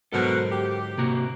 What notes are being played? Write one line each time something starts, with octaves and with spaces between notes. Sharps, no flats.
G#2 B2 D3 F#3 A4 A#4 C5 F#5
G4
C3 A#3 F#4